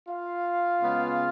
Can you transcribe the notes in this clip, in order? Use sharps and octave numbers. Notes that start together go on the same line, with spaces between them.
F4 F5
C#3 G#3 B3